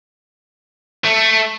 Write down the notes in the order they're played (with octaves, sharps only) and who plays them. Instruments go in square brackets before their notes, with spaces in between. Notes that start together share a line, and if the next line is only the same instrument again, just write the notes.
[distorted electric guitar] A3